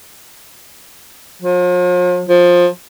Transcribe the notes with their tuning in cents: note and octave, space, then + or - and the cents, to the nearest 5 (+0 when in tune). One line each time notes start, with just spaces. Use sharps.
F3 +45
F3 +15